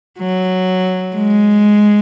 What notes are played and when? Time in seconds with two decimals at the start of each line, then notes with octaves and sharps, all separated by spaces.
0.19 F#3
1.16 G#3